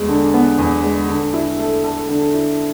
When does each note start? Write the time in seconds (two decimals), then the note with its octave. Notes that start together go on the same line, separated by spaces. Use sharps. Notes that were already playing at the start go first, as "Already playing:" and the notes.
Already playing: E2 G#3
0.09 D3
0.34 B3
0.58 E2
0.83 G#3
1.09 D3
1.34 E4
1.59 A3
1.84 A4
2.09 D3
2.34 E4